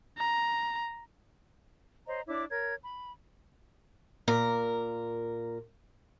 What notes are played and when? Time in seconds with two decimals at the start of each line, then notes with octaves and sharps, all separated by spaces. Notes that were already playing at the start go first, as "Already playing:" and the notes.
0.18 A#5
2.07 C5 C#5 D#5 A#5
2.27 D4 E4 C#5 D6
2.51 A#4 C#5 G#6
2.83 B5
4.28 A#2 A#4